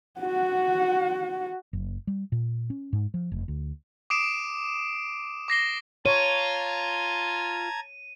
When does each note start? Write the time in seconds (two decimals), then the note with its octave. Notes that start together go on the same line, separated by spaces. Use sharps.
0.20 F#4 F#5
1.73 F#1
2.07 G3
2.32 A#2
2.70 C#4
2.93 G#2
3.14 F3
3.32 F1
3.48 D2
4.10 D6 D#6 C7 D7 E7
5.48 D6 A#6 C7 G7
6.06 F4 C#5 A5 A#5 G#6 D#7